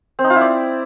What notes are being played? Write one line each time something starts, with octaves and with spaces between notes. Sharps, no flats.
C4
D#4
F4
E4
D5